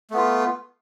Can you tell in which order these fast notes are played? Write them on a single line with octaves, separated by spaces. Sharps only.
A3 B3 F4